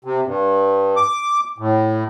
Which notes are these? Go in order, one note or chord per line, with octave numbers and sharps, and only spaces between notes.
C3
G2
D6
A2